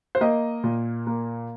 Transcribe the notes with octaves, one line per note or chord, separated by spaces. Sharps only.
C5
A#3 D#5
A#2
A#3